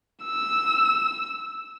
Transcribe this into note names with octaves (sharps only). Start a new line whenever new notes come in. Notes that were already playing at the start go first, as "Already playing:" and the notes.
E6